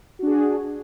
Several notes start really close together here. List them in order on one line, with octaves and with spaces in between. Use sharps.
F#4 D4 G#4